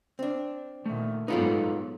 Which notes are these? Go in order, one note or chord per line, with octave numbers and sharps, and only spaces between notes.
C4 D4
A#2 D3 D#3 A3
G#2 F#3 B3 D#4 F4 A4 B4 C#5